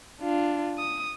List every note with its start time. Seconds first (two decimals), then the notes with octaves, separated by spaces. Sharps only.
0.21 D4 F4
0.78 D#6